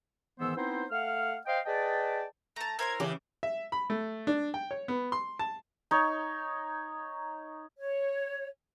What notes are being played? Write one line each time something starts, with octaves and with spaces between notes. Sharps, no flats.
G#2 D#3 E3 B3 C5 E6
B3 C4 D#4 E4 C5
A3 F5 F#5 F6
C5 D#5 F5 G5
G#4 B4 D5 D#5 G5 A5
A3 A5 A#5
E4 A#4 C5 C#5 A#5 G#6
C#3 E3 G4 D6
E5
B5
A3
D4
G5
C#5
B3
C6
A5
D#4 C#5
C#5